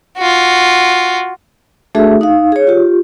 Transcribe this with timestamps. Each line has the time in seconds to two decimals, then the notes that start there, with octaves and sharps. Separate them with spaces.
0.18 F4 F#4
1.95 A3 D4 F#4 G#4 A4 E5
2.21 D#4 F5
2.52 G#4 C#5
2.67 F4 G4